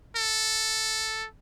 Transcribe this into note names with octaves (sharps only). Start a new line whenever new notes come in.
A4